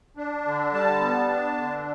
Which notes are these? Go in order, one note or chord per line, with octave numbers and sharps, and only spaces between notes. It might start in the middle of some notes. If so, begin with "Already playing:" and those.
D4
D3
G3 A5
B3
D4
D3